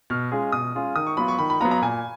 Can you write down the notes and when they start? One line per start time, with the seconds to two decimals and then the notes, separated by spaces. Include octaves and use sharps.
0.10 B2 F6
0.32 G#3 C#4 F4 G#4
0.52 B2 D#6
0.75 G#3 C#4 F4 G#4
0.96 D#3 D#6
1.07 C#6
1.17 F#3 B3 F4 B5
1.28 C#6
1.38 D#3 B5
1.50 B5
1.60 F#3 B3 F4 A#5
1.71 A#5
1.82 A#2 G#5